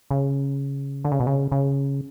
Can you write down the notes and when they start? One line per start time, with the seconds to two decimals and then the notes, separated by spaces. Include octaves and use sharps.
0.11 C#3
1.05 D3
1.12 C#3
1.20 B2
1.27 C#3
1.52 C#3